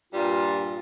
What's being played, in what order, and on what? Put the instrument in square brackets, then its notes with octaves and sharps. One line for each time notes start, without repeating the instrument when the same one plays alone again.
[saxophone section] G2 A#2 G3 [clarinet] F4